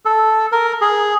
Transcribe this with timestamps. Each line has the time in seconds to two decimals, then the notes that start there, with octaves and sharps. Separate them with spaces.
0.05 A4
0.52 A#4
0.81 G#4